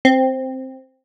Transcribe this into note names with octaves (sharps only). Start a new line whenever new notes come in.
C4